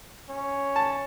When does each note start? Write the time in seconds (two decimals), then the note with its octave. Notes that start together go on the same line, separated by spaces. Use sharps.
0.30 C#4
0.76 A5